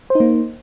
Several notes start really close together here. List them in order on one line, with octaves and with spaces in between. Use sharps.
C5 D#4 A#3